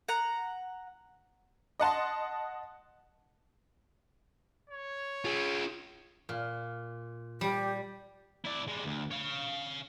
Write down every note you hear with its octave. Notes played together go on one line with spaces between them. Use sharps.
F#5 A#5
D#5 F#5 A5 C6
C#5
F4 G#4
A#2
G3 G4
E4 D5
G3 G#3
D2
C#5 F5